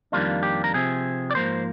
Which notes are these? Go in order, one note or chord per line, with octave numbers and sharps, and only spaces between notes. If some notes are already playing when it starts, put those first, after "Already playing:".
F2 D#3 G3 A#3 D4 F4
G4
A#4
C3 F3 C4 G#4
D5
G#2 F3 A#3 C5